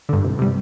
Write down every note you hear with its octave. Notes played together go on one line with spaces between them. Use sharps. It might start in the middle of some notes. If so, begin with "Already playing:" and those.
G2 D3
C2
C3 G3